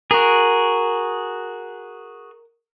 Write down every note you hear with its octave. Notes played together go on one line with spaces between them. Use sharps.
F#4 G#4 A#4